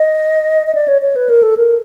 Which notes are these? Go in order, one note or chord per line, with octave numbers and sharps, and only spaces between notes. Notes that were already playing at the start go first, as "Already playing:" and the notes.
Already playing: D#5
D#5
D5
C#5
C#5
B4
A#4
A4
A#4